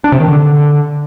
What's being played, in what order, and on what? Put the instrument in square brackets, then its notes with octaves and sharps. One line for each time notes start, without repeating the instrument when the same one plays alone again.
[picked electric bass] D4
C3
D#3
D3